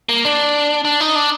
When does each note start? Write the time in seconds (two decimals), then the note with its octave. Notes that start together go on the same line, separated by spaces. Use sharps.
0.09 A#3
0.25 D4
0.85 D4
1.01 D#4
1.15 D4